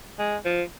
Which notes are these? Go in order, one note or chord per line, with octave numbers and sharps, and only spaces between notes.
G#3
F3